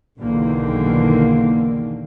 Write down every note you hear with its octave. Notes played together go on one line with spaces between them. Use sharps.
B1 E2 D3 D#3 A#3